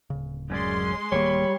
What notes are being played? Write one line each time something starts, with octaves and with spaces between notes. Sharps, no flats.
D1 C#3
F#2 G#3 C#4 D5 C6
D1 D#3 G3 A#3 C#5